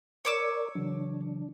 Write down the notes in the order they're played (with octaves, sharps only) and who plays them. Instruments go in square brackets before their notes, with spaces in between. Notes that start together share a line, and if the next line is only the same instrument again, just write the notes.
[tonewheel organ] A#4 D5 [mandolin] C#5 D6 E6
[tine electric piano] C#3 E3 F#3 [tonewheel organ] D4